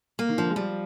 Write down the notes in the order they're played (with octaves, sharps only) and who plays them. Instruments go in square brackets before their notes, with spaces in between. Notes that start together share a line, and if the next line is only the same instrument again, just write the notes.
[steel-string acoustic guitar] A#3
[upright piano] D#3
[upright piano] D3 [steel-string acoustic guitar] F3
[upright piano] G#3
[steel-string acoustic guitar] F3 [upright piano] G3